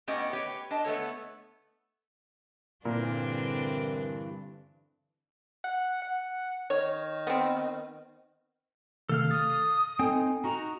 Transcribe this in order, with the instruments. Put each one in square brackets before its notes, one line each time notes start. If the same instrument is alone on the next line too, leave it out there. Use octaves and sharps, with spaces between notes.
[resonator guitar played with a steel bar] A2 A3 B3 C#4 G4 D#5
G4 B4 C#5 G5
D4 D#5 A5
A3 B3 A4 C#5
[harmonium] G2 E3 [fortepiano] A#2 [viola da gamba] D3 C4 D4 [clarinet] A#4
[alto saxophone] F#5
F#5
[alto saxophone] D#3 [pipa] C#5
[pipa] B3 C4
[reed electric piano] C3 D#3 A3 [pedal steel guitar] A4 F5 F6
[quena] D#6 [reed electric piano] A6
[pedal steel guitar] C4 D#4 [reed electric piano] A4 G5 G#5
[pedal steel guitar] D#4 F#4 [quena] A#5